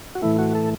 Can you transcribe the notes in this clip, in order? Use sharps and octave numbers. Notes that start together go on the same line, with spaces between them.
F#4
A2 E3 A3 E4
F#4
A4